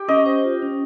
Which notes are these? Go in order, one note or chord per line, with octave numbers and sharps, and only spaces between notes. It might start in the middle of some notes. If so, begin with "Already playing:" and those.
Already playing: G4
C#4 D#5
C5
F4
C#4